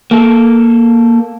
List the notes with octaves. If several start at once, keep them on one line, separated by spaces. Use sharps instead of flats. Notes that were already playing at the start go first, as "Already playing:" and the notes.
A#3 A4